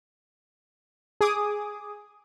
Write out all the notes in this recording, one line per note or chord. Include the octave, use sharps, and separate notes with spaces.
G#4 D6 D#6